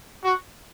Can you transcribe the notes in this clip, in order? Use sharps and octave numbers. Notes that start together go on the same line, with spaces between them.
F#4